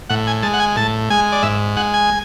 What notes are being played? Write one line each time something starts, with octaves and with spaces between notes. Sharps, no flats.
A2 F#5
G#5
G#3 A5
F#5
G#5
A2 A5
G#3 G#5
D5
G#2 E5
G#3 F#5
G#5